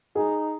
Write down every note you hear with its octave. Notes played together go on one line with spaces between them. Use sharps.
D#4 G#4